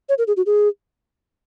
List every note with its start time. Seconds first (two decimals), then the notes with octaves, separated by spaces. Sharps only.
0.09 C#5
0.18 A#4
0.28 G#4
0.37 F#4
0.46 G#4